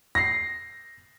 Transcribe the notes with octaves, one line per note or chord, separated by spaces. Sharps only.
A#6 C7